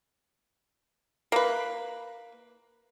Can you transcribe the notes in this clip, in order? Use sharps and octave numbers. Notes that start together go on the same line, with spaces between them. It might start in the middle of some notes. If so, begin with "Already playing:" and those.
A#3 B4